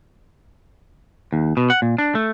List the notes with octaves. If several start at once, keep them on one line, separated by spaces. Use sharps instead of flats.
D#2
B2
F#5
A#2
D4
A3